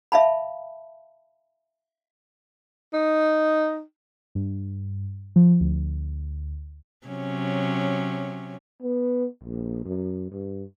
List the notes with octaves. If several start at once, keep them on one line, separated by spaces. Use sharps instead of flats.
E5 F5 A5 B5
D#4
G2
F3
D2
C3 F#3 C#4
B3
A#1
F#2
G2